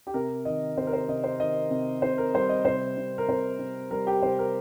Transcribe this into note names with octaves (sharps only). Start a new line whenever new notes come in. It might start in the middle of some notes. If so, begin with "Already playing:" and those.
G4
C3 A#4
D#3 D#5
C3 C5
A#4
C5
C3 D#5
C5
D#3 D#5
C3
C3 C5
A#4
G3 C5
D#5
C3 C5
C3
A#4
C3 C5
C3
G3 A#4
G4
C3 C5
A#4